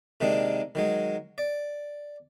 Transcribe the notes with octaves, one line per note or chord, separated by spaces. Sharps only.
C3 D#3 G#3 A#3 D4
D#3 F#3 G#3
D5